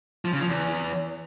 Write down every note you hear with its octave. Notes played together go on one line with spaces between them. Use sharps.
F3
C#3
F3
E2